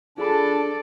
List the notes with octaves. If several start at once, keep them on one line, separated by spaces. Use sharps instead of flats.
D4 F4 G#4 A4 D5 B5